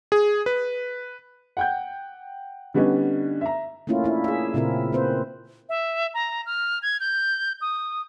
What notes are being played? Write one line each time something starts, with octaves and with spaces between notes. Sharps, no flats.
G#4
B4
F#5 G5 G6
D3 G3 B3 C#4 D#4
E5 A#5
A3 A#3 C#4 E4 F4
D4 E4
G#4 E5
A#2 C#3 C4 E4 F4 A#4
A#3 C4 B4 C5
E5
A#5
F6
G#6
G6
D#6